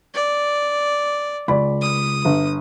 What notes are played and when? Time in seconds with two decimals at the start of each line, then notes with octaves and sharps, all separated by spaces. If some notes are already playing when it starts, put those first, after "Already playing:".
0.14 D5
1.48 C#2 D5 B5
1.81 D#6
2.25 G1